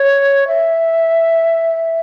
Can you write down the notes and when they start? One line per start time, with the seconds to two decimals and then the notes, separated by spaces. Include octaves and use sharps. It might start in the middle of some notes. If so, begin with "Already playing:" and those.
Already playing: C#5
0.47 E5